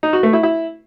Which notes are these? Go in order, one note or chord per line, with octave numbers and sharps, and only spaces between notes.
D#4
F#4
A3
E4
E4